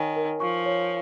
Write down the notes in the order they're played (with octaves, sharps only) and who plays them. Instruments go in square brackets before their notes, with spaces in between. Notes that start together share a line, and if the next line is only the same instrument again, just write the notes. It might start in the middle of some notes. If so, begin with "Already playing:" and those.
Already playing: [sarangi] D#3 [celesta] C#5 G#5
[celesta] A#4
[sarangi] F3 [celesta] C#6
[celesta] C#5